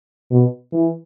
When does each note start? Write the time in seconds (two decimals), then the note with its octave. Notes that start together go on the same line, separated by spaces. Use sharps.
0.31 B2
0.73 E3